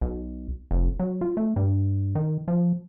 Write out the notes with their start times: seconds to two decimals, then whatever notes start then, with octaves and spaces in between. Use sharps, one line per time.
0.01 B1
0.71 F1
1.00 F#3
1.21 F4
1.37 A3
1.56 G2
2.15 D#3
2.48 F3